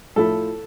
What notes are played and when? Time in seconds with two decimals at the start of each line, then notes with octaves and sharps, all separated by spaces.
0.16 A2 F3 A3 E4 A4